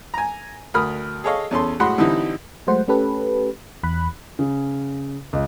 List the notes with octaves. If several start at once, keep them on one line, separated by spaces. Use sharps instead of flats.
G#5 A#5
D2 A#4 B5 D#6 F6
G#4 A4 C#5 D#5 F5
E2 C#4 A4 C6
A2 G#3 F#4 F#5 B5 C6
D3 E3 G3 C4 D#4 E4
F#3 G#3 A3 C5 F#5
A3 C#4 G4 A4 B4
E2 B5 F#6
C#3
C#2